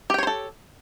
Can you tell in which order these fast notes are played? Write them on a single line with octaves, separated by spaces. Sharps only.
G4 G5 C#5 C5 A4